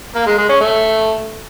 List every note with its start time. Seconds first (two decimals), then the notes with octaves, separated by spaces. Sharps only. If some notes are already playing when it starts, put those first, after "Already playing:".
0.15 A#3
0.27 G#3
0.38 G#3
0.49 C#4
0.61 A3